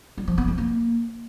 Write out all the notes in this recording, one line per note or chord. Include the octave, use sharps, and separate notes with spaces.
G3
F3
B3
G#3
A#3